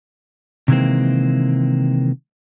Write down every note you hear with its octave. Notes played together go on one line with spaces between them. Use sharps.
C3 D#3 E3 G#3 A#3 C4